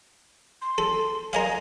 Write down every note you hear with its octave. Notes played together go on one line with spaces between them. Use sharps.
C6
A4
A#4 D#5 F5 G#5